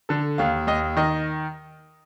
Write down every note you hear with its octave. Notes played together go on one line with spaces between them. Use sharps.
D3 A4
D#2 F5
D#2 D#5
D#3 D#5